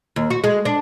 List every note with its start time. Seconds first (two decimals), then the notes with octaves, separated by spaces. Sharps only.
0.16 D#2
0.30 F#4
0.44 G#3
0.65 D4